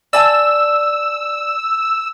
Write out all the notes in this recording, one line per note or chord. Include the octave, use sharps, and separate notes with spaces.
D5 G#5 A5 E6